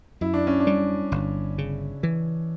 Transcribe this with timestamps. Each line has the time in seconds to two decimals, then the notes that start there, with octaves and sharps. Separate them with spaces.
0.21 F#2 E4
0.34 D4
0.47 C#4
0.60 D4
0.67 G3
1.12 G1
1.58 C#3
2.03 E3